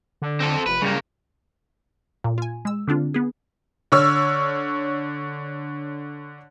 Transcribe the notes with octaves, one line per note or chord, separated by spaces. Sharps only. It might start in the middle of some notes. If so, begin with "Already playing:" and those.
D3
C4 A4
F1 B4
C#3 G3 A#3
A#2
F4 G#5
G#3 E6
D3 C4 D4 F4
B3 G#4
D3 C#5 E6 F6